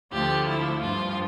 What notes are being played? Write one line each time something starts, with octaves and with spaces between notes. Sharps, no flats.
D2 D3 F3 G4
E4
G2 F3 F4